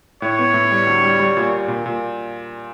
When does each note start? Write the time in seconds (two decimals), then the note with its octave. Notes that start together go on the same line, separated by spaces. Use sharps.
0.22 A2 C#5
0.39 B3
0.54 A2
0.71 G3
0.87 D2
1.04 G3
1.20 G3
1.37 A#2
1.53 A#2
1.68 A#2
1.86 A#2